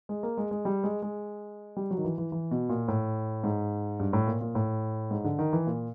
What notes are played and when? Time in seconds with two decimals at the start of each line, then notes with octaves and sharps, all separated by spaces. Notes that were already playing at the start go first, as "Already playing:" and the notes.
0.09 G#3
0.23 A#3
0.37 G#3
0.51 G#3
0.65 G3
0.84 G#3
1.02 G#3
1.77 G3
1.91 F#3
1.97 D#3
2.04 E3
2.18 E3
2.32 E3
2.51 B2
2.69 A#2
2.88 A2
3.44 G#2
4.00 G2
4.13 A2
4.27 A#2
4.41 A#2
4.55 A2
5.11 G#2
5.25 D3
5.39 D#3
5.53 E3
5.67 A#2